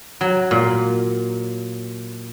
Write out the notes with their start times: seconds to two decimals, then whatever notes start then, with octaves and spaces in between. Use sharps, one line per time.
0.21 F#3
0.51 A#2